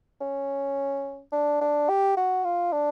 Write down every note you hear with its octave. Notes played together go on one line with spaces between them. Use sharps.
C#4
D4
D4
G4
F#4
F4
D4